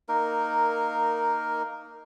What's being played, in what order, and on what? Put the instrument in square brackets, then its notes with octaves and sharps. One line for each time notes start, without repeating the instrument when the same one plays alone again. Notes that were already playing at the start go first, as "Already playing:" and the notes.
[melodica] A#3 D#4 A#4